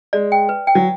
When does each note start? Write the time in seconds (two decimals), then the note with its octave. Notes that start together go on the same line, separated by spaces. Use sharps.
0.13 G#3 D5
0.32 G5
0.49 B4
0.67 G5
0.75 F#3